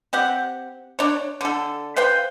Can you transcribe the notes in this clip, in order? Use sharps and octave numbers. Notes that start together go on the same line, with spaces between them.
C4 G4 F#5
D4 C#5
D3 A4
B4 C5 F5 G5